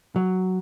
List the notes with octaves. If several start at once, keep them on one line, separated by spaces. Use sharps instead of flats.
F#3